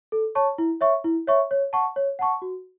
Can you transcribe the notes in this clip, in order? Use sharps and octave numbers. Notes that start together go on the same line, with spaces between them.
A4
C#5 A5 C#6
E4
C#5 E5 C#6
E4
C#5 E5 C#6
C#5
F#5 A5 C#6
C#5
F#5 A5 C#6
F#4